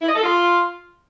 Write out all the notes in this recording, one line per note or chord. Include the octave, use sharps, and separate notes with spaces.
E4
D#5
A4
F4